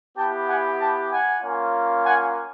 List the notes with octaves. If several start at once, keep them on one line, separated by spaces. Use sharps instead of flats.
B3 E4 G4 G5 A5
F#5 G#5
G5 A5
F#5 G#5
A#3 C#4 F4
F#5 G#5